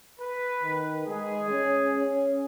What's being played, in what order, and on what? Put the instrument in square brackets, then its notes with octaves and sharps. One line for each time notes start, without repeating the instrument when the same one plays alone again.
[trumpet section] B4
[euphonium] D#3
[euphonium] G#3 [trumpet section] G#4
[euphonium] C#4
C#4